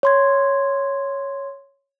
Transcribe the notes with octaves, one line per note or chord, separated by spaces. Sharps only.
C#5 C6 G#6